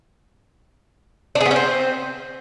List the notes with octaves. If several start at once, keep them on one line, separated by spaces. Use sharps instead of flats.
D4
G#4
B3
C#4
C4